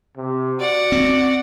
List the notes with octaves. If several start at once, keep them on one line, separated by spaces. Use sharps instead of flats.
C3
F#4 D5 F#5
C4